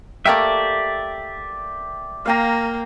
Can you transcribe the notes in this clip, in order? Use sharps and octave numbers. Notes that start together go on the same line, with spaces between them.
A3 A#3 G4 D5 E5 G5
A#3 F5 G5 A#5